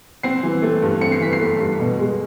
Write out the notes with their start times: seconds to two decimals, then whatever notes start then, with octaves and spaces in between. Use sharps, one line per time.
0.23 C4 C7
0.43 E3
0.62 A3
0.82 G2
1.01 C4 C#7
1.12 C7
1.21 E3 B6
1.33 C7
1.40 A3
1.60 G2
1.79 B2
1.99 G#3